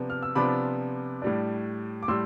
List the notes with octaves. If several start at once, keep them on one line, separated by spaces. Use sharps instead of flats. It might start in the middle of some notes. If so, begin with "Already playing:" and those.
Already playing: C3 F3 B3 D4
F6
E6
C3 F3 B3 D4 B5 D6
A2 G3 D4
D6
A2 G3 C6 E6